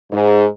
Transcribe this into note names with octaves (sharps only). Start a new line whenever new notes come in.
G#2